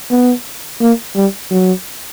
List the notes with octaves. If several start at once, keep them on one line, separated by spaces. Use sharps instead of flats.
B3
A#3
G3
F#3